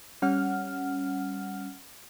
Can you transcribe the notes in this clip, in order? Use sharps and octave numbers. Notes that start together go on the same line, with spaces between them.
G3 C#4 F#5 F6